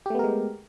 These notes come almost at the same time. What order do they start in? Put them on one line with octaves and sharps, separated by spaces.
G4 A3 B3 A#4 G#3